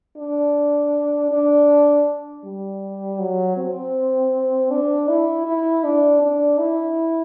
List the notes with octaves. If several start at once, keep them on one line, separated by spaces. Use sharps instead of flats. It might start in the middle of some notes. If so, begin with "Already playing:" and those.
D4
D4
G3
F#3
C4
D4
E4
E4
D4
D4
E4